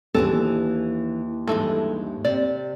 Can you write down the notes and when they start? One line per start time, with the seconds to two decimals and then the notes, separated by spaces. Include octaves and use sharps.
0.14 D#2 E3 D4 G#4 A4
1.47 G2 E3 G#3 D#4 A4
2.25 C3 D5